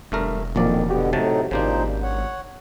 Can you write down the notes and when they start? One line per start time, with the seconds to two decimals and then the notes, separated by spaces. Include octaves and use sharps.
0.12 E1 G2 A3 A#4
0.56 A#1 F2 A#2 D#3 F3 F#3 A#3 D5
0.90 B2 D3 B3 F#4 G4
1.13 A2 C3 F#3 A3 D#4 A5
1.51 G#1 A#2 C#3 A#3 D4 D#4 C5
2.03 C#5 F#5